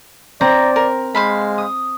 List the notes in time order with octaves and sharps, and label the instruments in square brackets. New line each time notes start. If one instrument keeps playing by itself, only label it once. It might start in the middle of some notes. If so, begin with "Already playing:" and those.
[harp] C4 [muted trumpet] D5 [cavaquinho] A#5
[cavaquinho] A#4
[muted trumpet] G#3 [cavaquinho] C5 F5 B5
[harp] D#6